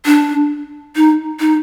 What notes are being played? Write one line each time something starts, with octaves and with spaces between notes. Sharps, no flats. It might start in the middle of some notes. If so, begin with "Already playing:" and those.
D4
D#4
D#4